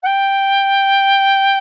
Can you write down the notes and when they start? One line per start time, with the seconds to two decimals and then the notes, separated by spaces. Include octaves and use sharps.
0.02 F#5
0.06 G5